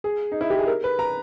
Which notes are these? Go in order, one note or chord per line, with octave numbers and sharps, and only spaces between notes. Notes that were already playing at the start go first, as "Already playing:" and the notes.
G#4
D#4
E4
G4
G#4
A#4
B4
A#5